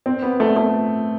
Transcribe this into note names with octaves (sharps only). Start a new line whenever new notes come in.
C4
B3
A3
A3